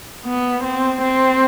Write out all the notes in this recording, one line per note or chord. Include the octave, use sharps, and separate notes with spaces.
B3
C4
C4